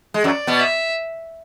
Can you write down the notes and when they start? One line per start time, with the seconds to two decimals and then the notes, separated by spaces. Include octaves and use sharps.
0.14 G#3
0.24 F#2 F#3 D5
0.47 B2 B3
0.60 E5